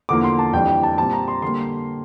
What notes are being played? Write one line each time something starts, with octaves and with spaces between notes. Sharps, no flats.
E2 D3 F3 A#3 D6
C6
A5
F2 E3 G3 D4 G5
G5
A5
A#2 G3 C4 A5
A#5
C6
D3 G3 A#3 C6